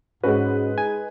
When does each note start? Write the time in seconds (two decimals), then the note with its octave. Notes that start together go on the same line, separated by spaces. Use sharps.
0.24 G#2 G#3 C#4 F#4 B4
0.78 D#4 G#5